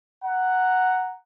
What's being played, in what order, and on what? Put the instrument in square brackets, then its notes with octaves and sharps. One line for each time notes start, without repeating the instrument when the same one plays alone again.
[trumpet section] F#5 A#5